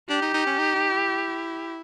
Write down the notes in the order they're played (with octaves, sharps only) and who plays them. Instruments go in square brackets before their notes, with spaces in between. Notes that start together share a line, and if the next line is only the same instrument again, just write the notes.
[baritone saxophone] D4 [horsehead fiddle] G4
[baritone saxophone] D#4
D#4
C#4
D#4
D#4
E4